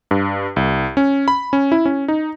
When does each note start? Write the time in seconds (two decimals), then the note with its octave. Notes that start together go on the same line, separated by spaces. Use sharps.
0.11 G2
0.56 C2
0.97 C#4
1.28 B5
1.53 C#4
1.72 E4
1.85 C#4
2.08 D#4